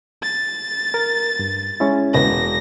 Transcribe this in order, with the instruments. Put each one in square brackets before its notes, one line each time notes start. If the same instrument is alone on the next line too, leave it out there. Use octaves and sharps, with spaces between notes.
[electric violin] A6
[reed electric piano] A#4
G2
G#3 C#4 E4
[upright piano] E1 B4 [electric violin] A#6